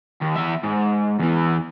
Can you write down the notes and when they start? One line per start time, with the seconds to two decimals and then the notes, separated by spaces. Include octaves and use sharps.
0.22 D#2
0.36 E2 E5
0.64 G#2
1.19 E2 E3